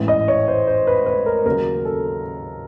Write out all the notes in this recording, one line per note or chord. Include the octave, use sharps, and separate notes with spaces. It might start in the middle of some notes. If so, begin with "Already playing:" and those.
Already playing: A1 G#2 E3
D#5
C#5
C5
C5
B4
B4
A#4
D#2 C#3 F#3 A#4
A4